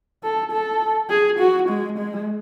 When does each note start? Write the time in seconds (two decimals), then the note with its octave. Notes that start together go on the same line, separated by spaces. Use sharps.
0.23 A4
0.51 A4
1.10 G#4
1.39 F#4
1.69 G#3
1.98 G#3